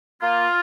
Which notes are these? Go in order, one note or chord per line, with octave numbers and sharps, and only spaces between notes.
A#3 F4